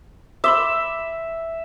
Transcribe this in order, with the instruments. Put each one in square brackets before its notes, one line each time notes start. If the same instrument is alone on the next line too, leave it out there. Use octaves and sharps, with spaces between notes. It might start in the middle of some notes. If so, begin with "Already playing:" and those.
[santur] E5 [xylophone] B5 C6 D6